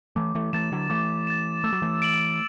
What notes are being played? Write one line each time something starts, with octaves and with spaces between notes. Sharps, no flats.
E3 A3 D6
E3 A3
E3 A3 A6 E7
D3 F#3
E3 A3 D6
A6 E7
A3 E6
F#3
E3 A3
D7 F#7